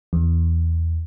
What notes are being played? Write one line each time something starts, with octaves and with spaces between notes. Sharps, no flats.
E2